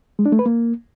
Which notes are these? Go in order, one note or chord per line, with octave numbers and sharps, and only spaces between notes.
G#3
D4
A3
B4
A#3